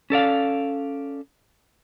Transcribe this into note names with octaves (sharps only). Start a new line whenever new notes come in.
C#4 A4 D5 F5